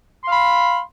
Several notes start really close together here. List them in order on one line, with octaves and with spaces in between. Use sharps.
C6 F5 B5